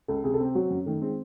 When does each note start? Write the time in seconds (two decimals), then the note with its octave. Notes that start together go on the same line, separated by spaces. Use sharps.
0.08 C#2 A4
0.24 C3 G#4
0.34 A4
0.40 C4
0.55 F#3 F#4
0.71 F#2
0.86 D#3 A3
1.01 G#3 C4